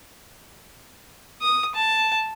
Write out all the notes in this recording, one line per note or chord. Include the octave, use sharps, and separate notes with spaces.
D#6
A5